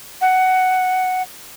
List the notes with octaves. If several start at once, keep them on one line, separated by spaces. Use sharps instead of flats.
F#5